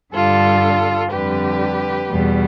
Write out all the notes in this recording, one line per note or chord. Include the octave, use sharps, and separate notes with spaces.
G2 D3 G3 F4 A4
F2 D3 G3 G4 B4
E2 B2 G3